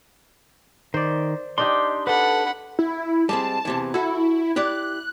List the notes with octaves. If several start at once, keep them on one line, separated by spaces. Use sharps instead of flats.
D#3 C5 D5
D4 D#4 G4 C6
A4 B4 F#5 B5
E4
G3 G#3 C4 A5
E2 C3 E3
E4 F#4 A4
E4 G4 D5 F#6